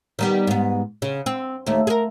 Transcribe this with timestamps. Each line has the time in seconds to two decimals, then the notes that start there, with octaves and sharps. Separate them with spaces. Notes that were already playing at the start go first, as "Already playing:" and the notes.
0.19 D#3 G3 B3
0.47 G#2 B3
1.02 C#3
1.26 C4
1.66 D#2 A3
1.87 G#4 A#4